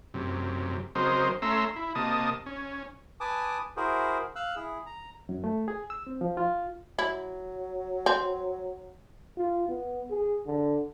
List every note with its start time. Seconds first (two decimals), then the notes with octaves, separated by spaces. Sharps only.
0.14 F#2 C3
0.95 C#3 F#3 C4 A#4 C5 D#5
1.42 A3 C#4 E5 A#5 C6 E6
1.76 E4
1.95 C3 A#3 D#5 A5 D#6
2.46 C#4
3.20 B4 G#5 A5 D6 D#6
3.77 E4 F#4 G#4 A#4 C5
4.36 F5 E6 F#6
4.56 E4 G#4
4.86 A#5
5.29 F#2
5.44 A3
5.68 G#4
5.90 E6
6.07 C4
6.21 F3
6.37 F4
6.99 F#3 E4
8.06 C4
9.37 F4
9.69 B3
10.11 G#4
10.46 D3